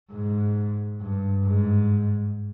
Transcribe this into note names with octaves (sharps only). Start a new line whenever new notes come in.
G#2
G2
G#2